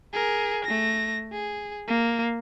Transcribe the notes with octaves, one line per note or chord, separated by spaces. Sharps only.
G#4 A#4
A3 A#6
G#4
A#3